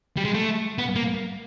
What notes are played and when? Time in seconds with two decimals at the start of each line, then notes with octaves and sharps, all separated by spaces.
0.17 G3
0.25 G#3
0.34 A3
0.78 B3
0.96 A#3